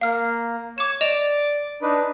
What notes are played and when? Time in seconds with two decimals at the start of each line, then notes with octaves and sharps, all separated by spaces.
0.01 A#3 F5 F6
0.78 C#5 D6 E7
1.01 D5 D#5 D6 E7 F7
1.82 D4 D#4 B4